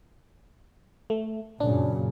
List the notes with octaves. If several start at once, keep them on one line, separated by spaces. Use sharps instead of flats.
A3
F#2 A#2 C#3 D4